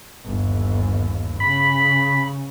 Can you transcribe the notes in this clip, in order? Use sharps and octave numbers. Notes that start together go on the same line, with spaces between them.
G1 D#2
C#3 B5